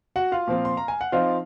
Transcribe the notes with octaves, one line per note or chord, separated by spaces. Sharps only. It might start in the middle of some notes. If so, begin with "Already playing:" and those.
F#4 F#5
F4 F5
A#2 F3 C4 F4
C6
A#5
G#5
F#5
F3 C4 D#4 F4 F5